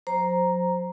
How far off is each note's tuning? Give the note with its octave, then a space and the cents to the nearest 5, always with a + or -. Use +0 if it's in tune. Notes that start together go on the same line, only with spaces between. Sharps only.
F#3 -40 C5 +0 A#5 +0